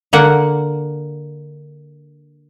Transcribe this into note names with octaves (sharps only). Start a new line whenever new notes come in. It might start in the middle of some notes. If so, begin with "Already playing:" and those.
D3 A#3 F#5